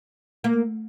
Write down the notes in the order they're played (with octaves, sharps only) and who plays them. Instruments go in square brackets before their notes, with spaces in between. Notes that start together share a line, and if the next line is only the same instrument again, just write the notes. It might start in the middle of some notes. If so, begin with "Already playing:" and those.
[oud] A#3